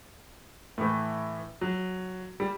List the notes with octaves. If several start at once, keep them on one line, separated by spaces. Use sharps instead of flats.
A2 E3 A3
F#3
G3